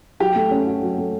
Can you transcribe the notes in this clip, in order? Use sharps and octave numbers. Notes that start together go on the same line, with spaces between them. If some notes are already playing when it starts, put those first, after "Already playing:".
F#3 G4
A3
C#4
F#4
F#3
A3